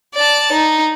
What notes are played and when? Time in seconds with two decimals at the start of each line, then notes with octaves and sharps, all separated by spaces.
0.15 D5 A5
0.52 D#4